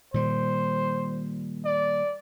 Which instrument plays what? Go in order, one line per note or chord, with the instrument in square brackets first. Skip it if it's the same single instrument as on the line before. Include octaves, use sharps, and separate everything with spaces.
[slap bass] A#2 D#3 G3 [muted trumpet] C5
[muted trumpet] D5